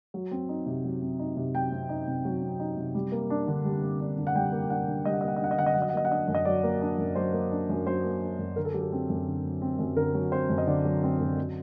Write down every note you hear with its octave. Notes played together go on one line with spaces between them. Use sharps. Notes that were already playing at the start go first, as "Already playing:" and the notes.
F#3
C4
D#4
C3
F#3
C4
D#4
C3
F#3 G5
C4
D#4
C3
F#3
C4
D#4
C3
G3
A#3
D4
D3
G3
A#3
D4
D3
F#5
G3 G5
A#3
D4 F#5
D3
G3 D#5
F#5
A#3 D#5
F#5
D#5
D4 F#5
D#5
D3 F#5
D#5
F#3 F#5
D#5
F#5
A#3 D#5
F#5
D4 D#5
F#2
D#5
F#3 D5
A#3
D4
F#2
F#3 C5
A#3
D4
F#2
F#3 C5
A#3
D4
F#2
D3 A#4
A4
F#3 G4
A4
C4
F#2
D3
F#3
C4
F#2
D3 A#4
F#3
C4 C5
F#2
D#5
D3 D5
F#3
C4
F#2
F#3